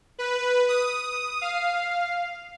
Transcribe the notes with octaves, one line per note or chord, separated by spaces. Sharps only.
B4
D#6
F5